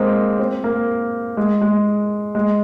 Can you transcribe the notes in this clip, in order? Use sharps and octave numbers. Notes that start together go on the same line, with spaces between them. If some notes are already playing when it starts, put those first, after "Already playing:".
Already playing: G#3 A#3 C4
C4
A#3
G#3
G#3
G#3